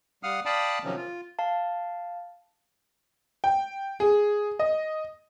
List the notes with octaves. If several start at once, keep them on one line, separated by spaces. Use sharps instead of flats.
G3 F5 F#5 D#6 F6
D5 F5 G5 A5 B5 D#6
C3 D#3 F3 F#3 C#4
F4
F5 A5
G5
G#4
D#5